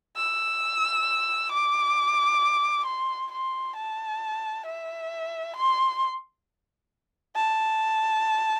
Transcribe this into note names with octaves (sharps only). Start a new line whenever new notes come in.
E6
D6
C6
C6
A5
E5
C6
A5